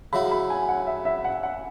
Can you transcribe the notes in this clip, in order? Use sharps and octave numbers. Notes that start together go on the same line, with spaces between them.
C#3 F#3 E4 B5
B5
G#5
F#5
E5
E5
F#5
F#5